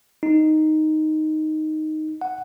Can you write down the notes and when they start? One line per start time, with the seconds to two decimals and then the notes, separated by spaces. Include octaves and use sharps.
0.23 D#4
2.21 F#5